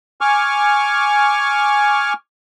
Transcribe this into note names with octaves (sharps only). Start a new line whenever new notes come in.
G#5 C#6 D6 F6